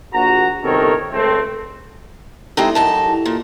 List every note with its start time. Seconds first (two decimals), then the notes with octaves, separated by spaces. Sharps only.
0.13 A#1 F#4 A#5
0.63 G1 C3 D#3 A4 A#4 C#5
1.12 C#2 A3 C4
2.57 G#3 C4 D#4 E4 G4 A4
2.75 F#2 D#4 A5
3.26 A#2